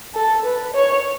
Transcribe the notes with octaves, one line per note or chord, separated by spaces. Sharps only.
A4
B4
C#5